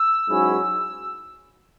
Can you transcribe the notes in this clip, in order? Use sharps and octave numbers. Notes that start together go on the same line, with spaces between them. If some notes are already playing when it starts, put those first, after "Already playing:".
Already playing: E6
G#2 F#3 C#4 E4 G#4